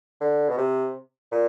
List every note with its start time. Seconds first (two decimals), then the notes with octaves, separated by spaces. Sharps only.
0.21 D3
0.49 B2
0.57 C3
1.32 A#2